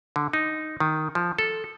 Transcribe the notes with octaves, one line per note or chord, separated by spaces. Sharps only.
D3
D#4
D#3
F3
A4